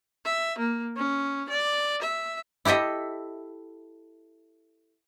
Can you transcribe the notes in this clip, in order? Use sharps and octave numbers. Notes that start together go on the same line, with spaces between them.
E5
A#3
C#4
D5
E5
E4 G4 A4 D#5 E5